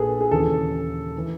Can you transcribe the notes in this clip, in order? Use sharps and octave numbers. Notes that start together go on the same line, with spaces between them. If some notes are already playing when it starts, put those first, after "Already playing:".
Already playing: A#1 A#2 G#4 A4 B4
G#4
D#2 C#3 E3 A4
E3